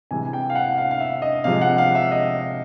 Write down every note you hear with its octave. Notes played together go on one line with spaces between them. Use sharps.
C3 E3 G#3 G#5
G5
F5
F#5
F5
F5
E5
D#5
C3 F3 G#3 F5
F#5
F5
E5
D#5